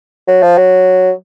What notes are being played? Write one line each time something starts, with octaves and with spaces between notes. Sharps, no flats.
F#3
F3
F#3